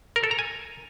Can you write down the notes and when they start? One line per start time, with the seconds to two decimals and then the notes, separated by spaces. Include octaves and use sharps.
0.16 A#4
0.24 A4
0.31 A#5
0.39 G#5